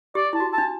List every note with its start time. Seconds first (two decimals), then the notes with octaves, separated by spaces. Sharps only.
0.15 G4 D5
0.33 E4 A5
0.40 F#4
0.53 A5
0.58 D4